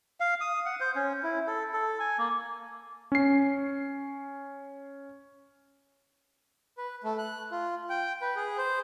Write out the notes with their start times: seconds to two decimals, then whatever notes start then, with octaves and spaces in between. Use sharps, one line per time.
0.20 F5
0.41 D#6
0.66 F#5
0.80 C5
0.95 C#4
1.23 E4
1.47 A4
1.73 A4
2.00 G#5
2.18 A#3
3.12 C#4 C7
6.78 B4
7.04 A3
7.18 F#6
7.52 F4
7.89 G5
8.22 B4
8.36 G#4
8.58 C5